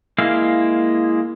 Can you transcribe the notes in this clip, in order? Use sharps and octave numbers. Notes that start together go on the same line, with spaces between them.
G#3 A#3 E4 F5 F6